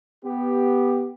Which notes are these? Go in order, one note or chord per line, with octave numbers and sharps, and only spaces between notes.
B3 G4